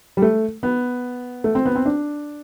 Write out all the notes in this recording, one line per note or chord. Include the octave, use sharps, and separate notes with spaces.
G3
A3
B3
A3
C4
B3
C4
D4